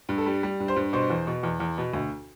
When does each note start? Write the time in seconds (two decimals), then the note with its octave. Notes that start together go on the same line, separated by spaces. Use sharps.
0.09 G2
0.18 A4
0.26 G3
0.43 G3
0.60 G2
0.68 C5
0.76 G2
0.93 B2 C5
1.10 E2
1.27 B2
1.43 E2
1.60 E2
1.78 B2
1.93 D2